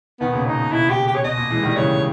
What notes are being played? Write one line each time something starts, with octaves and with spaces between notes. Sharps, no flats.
B2 D#3 B3
A#2 C#3
B2 D#4
B2
B2 E4
G4
G4
C#5
B2 D#5
A#2
E3 G#3
D#3 G3
C#3 E3 C#5